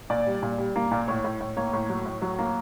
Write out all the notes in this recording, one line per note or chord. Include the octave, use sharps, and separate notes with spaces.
A#2 D5
G3
A#2
G3
A#3
A#2
A2 C#5
A2
A2
A#3 C#5
A2
F#3
A2
F#3
A#3